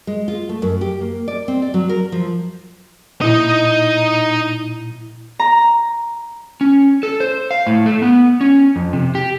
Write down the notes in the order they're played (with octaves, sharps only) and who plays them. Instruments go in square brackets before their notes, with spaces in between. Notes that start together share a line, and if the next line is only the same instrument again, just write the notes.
[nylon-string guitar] G#3
F4
A3
F#2
G4
A#3
D5
C4
D5
F#3
A#4
F3
[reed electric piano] A#2 E4 [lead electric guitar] D#4 D#5
[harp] A#5
[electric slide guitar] C#4
A4
C5
F5
A2
A3
B3
C#4
F2
C3
G4